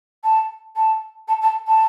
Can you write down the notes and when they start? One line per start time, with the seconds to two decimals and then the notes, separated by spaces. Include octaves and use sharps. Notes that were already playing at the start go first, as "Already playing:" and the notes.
0.23 A5
0.76 A5
1.28 A5
1.41 A5
1.67 A5